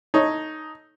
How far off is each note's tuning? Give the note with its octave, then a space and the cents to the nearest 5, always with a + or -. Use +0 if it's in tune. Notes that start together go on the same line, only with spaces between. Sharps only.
D#4 +0 A4 +0 C#5 +0